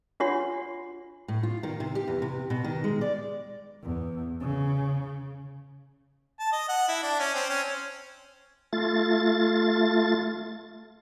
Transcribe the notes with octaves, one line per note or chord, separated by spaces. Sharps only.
D4 F4 F#4 C#5 F#5 C6
A2
F4
D#3
C3
G4
E2
C3
B2
D#3
G#3
D5
E2
C#3
A5
D#5
F#5
E4
D4
C#4
C4
C#4
A3 F4 A6